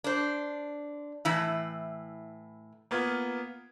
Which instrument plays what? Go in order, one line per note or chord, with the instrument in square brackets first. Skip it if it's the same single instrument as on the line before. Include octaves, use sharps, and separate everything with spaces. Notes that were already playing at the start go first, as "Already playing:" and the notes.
[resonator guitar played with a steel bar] D4 C5
A2 E3 E4
[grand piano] A#3 B3 F4 G#6